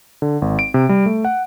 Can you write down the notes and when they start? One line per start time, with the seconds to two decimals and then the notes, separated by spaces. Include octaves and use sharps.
0.22 D3
0.42 G#1
0.59 D7
0.74 C3
0.89 G3
1.06 A3
1.25 F#5